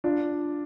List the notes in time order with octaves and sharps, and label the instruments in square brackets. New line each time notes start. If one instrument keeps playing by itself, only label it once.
[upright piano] D4 F4